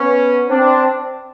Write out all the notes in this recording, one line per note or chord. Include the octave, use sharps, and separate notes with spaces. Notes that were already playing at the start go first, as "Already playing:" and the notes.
Already playing: B3 C#4
C4 D4